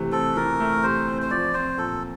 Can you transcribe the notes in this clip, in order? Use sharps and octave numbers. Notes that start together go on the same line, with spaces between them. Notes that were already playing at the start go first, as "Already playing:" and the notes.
Already playing: C3 E3 A3
C4 A4
E3 A#4
A3
C3 C5
C4
C5
F3 D5
C4 C5
A#2 A4